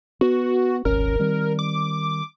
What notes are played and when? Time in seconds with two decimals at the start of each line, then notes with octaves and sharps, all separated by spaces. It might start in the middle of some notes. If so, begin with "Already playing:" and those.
0.21 B3 F#4
0.85 D#1 G#1 C#4 A#4
1.19 D#3 G3 C4
1.59 D6